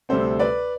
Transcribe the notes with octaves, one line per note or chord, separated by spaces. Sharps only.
D2 C3 G3 C4 A4 C5
B4 D5